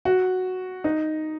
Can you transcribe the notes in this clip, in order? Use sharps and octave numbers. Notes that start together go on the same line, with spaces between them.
F#4
D#4